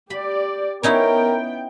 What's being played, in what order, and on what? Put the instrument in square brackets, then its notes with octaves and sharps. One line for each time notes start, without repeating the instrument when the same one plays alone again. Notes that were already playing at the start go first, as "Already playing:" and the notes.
[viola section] G4 D5 [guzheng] B5
[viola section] B3 G5 [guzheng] C#4 D#4 E4 [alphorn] A#4